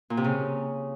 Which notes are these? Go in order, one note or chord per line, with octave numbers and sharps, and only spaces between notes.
A#2
C3
C#3